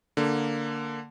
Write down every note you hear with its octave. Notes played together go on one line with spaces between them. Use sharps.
D3 A#3